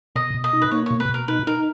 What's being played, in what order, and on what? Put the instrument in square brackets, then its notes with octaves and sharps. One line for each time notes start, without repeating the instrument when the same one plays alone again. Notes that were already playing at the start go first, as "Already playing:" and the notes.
[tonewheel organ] B2 [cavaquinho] D#5
[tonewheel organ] B2
[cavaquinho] D#5
[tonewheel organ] D#4
[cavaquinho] B4
[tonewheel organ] A#3 [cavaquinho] C#5
[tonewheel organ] B2 [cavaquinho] C#5
[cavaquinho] B4
[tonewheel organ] B2 [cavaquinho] A#4
[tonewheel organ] D#4 [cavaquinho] B4
[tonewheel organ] D#4 [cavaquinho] A#4